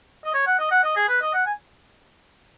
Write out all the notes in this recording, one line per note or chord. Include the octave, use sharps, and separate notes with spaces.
D#5
C#5
F#5
D#5
F#5
D#5
G#4
B4
D#5
F#5
G#5